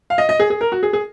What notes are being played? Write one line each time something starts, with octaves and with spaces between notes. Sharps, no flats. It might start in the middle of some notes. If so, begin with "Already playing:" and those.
F5
D#5
D#5
G#4
G#4
A#4
F#4
G#4
G#4